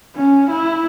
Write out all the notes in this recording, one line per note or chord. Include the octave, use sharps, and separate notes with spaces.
C#4
E4